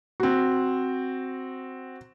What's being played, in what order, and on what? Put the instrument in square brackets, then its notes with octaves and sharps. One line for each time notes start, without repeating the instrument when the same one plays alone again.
[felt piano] C4 F#4